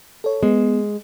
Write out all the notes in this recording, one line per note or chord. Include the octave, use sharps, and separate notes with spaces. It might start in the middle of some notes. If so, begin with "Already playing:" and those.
A4 C#5
G#3 B3